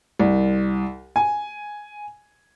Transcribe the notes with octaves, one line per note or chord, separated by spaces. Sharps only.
C2
G#5